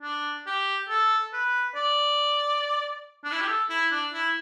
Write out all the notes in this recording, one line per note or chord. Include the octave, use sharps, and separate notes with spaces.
D4
G4
A4
B4
D5
D4
E4
G4
A4
E4
D4
E4